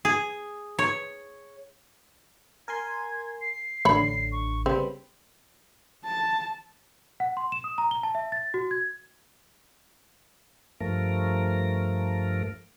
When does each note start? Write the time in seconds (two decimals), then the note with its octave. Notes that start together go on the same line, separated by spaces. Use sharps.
0.05 G#4
0.79 C#5
2.68 A#4 G#5 C6 G#6
3.41 C7
3.85 A1 D3 C#5 B5
4.32 C#6
4.66 C#3 G3 B3 C4 B5
6.05 A5
7.20 F#5
7.37 C6
7.52 E7
7.64 D#6
7.78 A#5
7.91 G7
8.03 A5
8.15 E5
8.32 A6
8.54 F#4
8.71 G#6
10.81 G2 F3 A3 A#4